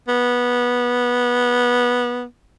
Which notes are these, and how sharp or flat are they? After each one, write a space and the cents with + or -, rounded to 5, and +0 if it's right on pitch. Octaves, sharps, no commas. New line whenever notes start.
B3 -15